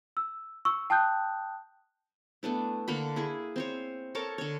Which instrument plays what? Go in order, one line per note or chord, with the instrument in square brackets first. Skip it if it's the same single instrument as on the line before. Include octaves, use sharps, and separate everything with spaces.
[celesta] E6
C#6 E6
G5 A5 D#6 F#6 G6
[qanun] A3 B3 D4 E4
D3 A#3 F#5 B5
E4 G#4
C4 C5 C#5
A4 A#4 C#5 A5
D3 C#5